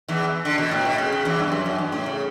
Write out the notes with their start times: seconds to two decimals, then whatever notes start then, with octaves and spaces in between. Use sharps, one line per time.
0.08 E2 E3
0.45 D3
0.58 B2
0.71 A2
0.85 B2
0.98 C#3
1.12 C#3
1.25 E2 E3
1.39 G2
1.51 F#2
1.66 F#2
1.78 G2
1.92 A2
2.06 C#3